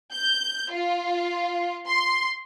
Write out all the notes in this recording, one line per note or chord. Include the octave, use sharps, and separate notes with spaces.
G6
F4
C6